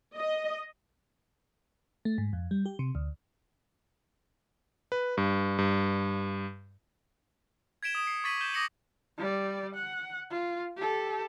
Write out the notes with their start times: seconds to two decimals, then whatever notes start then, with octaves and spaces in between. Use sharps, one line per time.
0.16 D#5
2.05 A3
2.18 G#2
2.33 F2
2.51 G3
2.66 G4
2.79 C3
2.95 D2
4.92 B4
5.17 G2
5.58 G2
7.83 G#6 B6 D7 E7 G7
7.95 D#6
8.07 C7 C#7 E7
8.24 C#6 D6 A6 B6 D#7 F#7
8.41 G6 E7 G7
8.54 D6 D#6 A#6 C#7 F#7
9.17 G3 D5
9.75 F#5
10.30 F4
10.77 G4 A4